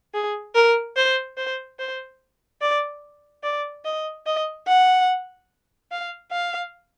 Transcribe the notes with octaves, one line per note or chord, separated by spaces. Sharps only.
G#4
A#4
C5
C5
C5
D5
D5
D#5
D#5
F#5
F5
F5